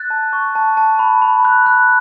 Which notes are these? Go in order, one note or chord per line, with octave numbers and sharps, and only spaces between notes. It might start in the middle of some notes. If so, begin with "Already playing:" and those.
Already playing: F#6 A6
A5
C#6
A5
A5
B5
B5
F#6
F#6